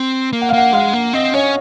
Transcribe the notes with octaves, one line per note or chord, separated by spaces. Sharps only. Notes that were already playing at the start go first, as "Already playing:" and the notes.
Already playing: C4
A#3
F#5
F5
A#3 F#5
G#3 F5
A#3
C4 D#5
C#4 C#5